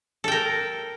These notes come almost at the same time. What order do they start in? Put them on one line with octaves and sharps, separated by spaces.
A4 G5 A#4